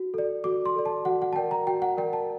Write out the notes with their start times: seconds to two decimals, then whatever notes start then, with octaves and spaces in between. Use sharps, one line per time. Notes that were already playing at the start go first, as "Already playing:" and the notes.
Already playing: F#4
0.14 A4 D5
0.44 F#4 D6
0.66 C6
0.76 A4 D5
0.86 A5
1.05 F#4 F#5
1.22 F#5
1.33 A5
1.36 A#4 D5 G5
1.51 A#5
1.67 F#4 G5
1.82 F#5
1.97 A#4 D5 G5
2.13 A5